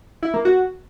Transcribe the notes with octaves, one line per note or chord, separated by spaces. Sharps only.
E4
A#3
F#4